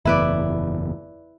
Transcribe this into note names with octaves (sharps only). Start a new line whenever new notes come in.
F#1 E2 A2 E4 B4 D5